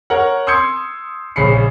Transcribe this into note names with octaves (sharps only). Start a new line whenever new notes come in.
A#4 C#5 F#5
C6 D#6 E6 G6 G#6 C#7
A#1 C#3 C#4 B5 C7 C#7